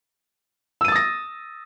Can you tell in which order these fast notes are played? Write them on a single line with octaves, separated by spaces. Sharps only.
E6 D#7 A6 D#6 A#6